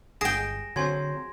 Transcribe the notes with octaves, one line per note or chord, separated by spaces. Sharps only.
G1 G#4 G5 A#6 D7 E7
D3 F#3 C4 C5 G#5 C6 G#6